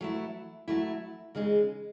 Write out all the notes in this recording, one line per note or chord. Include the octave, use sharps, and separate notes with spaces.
F#3 A3 E4
F#3 A3 E4
C#3 G#3 D#4 G#4